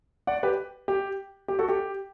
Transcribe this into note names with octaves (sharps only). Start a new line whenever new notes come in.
D5 F#5
G4 B4
G4
G4
F#4 A4
G4